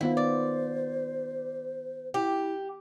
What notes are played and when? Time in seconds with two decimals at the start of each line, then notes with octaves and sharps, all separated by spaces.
0.01 D#3 B3 E4 F4 C5
0.17 D5
2.14 E4 G4